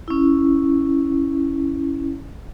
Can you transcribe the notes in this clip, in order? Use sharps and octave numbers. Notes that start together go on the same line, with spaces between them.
C#4 E4